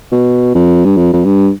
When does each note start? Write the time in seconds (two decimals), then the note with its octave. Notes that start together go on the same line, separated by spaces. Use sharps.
0.12 B2
0.55 F2
0.85 G2
0.97 F2
1.13 F2
1.25 G2